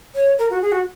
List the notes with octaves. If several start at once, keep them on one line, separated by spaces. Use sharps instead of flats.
C#5
A#4
F#4
G#4
F#4